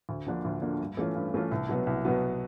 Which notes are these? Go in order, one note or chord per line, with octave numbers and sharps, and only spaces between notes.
D2
D3 F3 A#3 D4
D2
D3 F3 A#3 D4
G2
E3 A3 C#4 F4
G2
E3 A3 C#4 F4
C2
B2 F#3 B3
C2
B2 F#3 B3